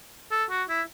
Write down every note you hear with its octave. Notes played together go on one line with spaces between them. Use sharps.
A4
F#4
E4